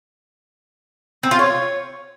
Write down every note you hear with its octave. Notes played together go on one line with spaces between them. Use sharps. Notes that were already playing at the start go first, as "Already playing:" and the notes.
C4
F4
C#5